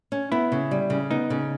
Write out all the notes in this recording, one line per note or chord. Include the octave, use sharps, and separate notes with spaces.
C#4
B3 E4
C#3
G3
C#3
B3 D#4
C#3